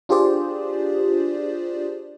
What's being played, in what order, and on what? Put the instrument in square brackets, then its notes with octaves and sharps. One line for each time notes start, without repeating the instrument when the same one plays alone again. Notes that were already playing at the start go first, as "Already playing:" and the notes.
[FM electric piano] D4 F4 G4 G#4 C5 D5